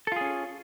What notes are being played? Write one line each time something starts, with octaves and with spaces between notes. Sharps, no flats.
C#4 F4 G#4 A4